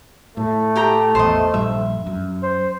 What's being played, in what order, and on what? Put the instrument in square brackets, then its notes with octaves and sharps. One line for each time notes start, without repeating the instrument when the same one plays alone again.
[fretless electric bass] A2 [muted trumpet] A3
[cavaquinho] G4 G5 A#5
[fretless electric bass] A1 E2 [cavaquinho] C5 D#5
[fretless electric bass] A#1 G2 [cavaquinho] E5
[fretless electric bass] F#2
[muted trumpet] C5